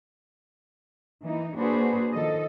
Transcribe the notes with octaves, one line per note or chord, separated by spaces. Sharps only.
E3 A#3 D#4
A#3 D4 F#4 G#4 B4 C5
D#3 F3 A4 D#5